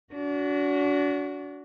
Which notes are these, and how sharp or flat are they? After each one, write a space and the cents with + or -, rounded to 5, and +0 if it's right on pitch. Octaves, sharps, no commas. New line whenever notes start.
D4 -35 F#4 +0